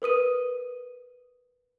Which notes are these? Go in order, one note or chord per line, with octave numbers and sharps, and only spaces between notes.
A#4 B4 D#6 D#7